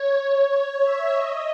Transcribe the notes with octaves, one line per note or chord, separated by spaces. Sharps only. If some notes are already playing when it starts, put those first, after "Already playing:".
Already playing: C#5
C#5
E5
D#5